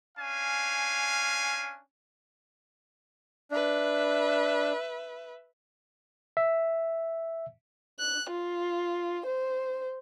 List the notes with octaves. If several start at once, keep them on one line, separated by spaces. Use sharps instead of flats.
C#4 D4 F5 G#5
D4 B4 E5
E5
F#6
F4
C5